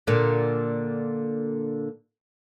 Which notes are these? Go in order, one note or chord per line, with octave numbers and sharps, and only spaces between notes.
A#2 D3